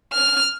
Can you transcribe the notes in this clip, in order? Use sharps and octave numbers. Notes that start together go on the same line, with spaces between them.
F6